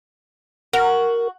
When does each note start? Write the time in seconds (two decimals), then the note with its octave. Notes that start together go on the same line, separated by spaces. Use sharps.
0.73 F#4 A#4